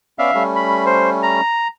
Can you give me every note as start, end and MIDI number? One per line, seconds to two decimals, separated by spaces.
0.19 0.31 59
0.19 0.31 61
0.19 0.31 74
0.19 0.43 76
0.19 0.43 77
0.35 1.41 55
0.35 1.41 57
0.35 1.41 61
0.56 0.84 83
0.86 1.10 72
1.23 1.68 82